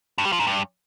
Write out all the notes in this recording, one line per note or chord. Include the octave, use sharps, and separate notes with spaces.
G2
G3
F3
G#2
G2